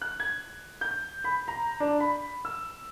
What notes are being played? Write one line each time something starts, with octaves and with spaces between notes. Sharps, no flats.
F#6
G#6
G6
B5
A#5
D4
B5
E6